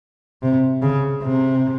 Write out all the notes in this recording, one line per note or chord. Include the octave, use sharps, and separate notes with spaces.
C3
C#3
C3